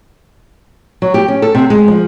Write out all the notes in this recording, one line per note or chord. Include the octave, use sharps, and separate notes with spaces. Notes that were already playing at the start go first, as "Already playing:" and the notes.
F#3
G4
C#4
A4
C3
G#3
F3